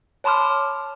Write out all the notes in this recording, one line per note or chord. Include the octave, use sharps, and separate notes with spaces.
C#5 A5 B5 C6 D6 F6